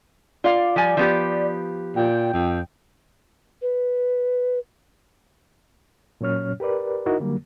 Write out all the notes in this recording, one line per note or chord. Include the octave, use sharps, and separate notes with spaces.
F4 D5 F5
F3 G3 G#5
F3 B3 G4
A#2 G5
F2
B4
A#2 F#3 C#4 C#5 F6
G4 A#4 B4 D5
D#4 E4 F#4 A#4 D#5
D3 F#3 G3 A#3